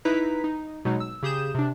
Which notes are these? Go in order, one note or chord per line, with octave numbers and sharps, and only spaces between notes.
D#4 E4 B4 A#5 B6
D#4
B2 F#3 G#3 D#4
E6
C#3 G4 G#4 D#6 G6 E7
C3 D4